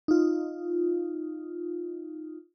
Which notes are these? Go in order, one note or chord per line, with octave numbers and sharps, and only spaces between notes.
D#4 F4